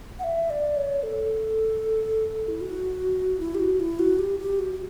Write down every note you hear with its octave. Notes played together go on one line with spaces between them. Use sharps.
F#5
E5
D5
C#5
A4
E4
F#4
E4
G4
F#4
E4
F#4
G4
G4
F#4
F#4